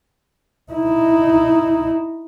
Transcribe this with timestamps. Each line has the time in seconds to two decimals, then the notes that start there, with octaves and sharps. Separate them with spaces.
0.72 D#4 E4